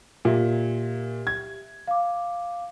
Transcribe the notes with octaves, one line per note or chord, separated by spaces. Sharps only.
A#2 G4 E5
G#6
F5 D6